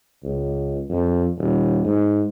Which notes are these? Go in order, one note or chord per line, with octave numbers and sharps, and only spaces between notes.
C#2
F2
D#1
G#2